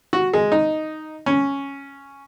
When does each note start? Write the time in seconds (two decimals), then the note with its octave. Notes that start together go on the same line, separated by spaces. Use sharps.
0.13 F#4
0.34 G#3
0.52 D#4
1.26 C#4